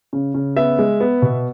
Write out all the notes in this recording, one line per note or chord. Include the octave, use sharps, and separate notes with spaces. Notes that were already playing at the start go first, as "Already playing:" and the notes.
C#3
C#3
B3 E5
G#3
B3
B2